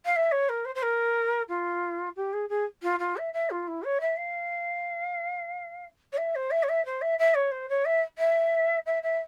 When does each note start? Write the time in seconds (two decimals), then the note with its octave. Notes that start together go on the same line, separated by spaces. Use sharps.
0.05 F5
0.16 E5
0.31 C#5
0.49 A#4
0.65 C5
0.75 C5
0.82 A#4
1.49 F4
2.16 G4
2.33 G#4
2.49 G#4
2.82 F4
2.99 F4
3.17 E5
3.33 E5
3.50 F4
3.67 E4
3.83 C#5
4.00 E5
4.16 F5
6.12 C#5
6.17 E5
6.35 C5
6.51 E5
6.63 C#5
6.69 E5
6.85 C5
7.01 E5
7.19 E5
7.34 C#5
7.51 C5
7.69 C#5
7.85 E5
8.18 E5
8.86 E5
9.03 E5